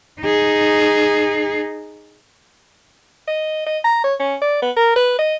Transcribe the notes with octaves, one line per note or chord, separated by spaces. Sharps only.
D#4 G#4
D#5
D#5
A#5
C#5
C#4
D5
B3
A#4
B4
D#5